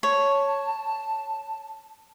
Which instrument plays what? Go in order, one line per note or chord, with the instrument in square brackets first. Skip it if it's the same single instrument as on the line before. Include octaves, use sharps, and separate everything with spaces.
[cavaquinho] C#5 [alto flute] A5